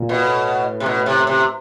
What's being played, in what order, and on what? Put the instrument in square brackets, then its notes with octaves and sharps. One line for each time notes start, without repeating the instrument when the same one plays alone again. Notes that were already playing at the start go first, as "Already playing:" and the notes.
Already playing: [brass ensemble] A#2
[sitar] B2
[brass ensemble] A2
[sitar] C3
B2
C3
C3